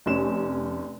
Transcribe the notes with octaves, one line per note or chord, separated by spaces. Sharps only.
F1 C3 C#4 E7